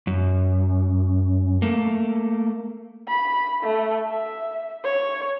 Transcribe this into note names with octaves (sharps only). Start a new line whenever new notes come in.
F#2
A3 A#3
B5
A3
E5
C#5